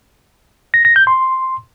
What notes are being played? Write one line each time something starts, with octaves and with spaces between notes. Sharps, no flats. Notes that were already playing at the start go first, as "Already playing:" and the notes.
A#6
A#6
G6
C6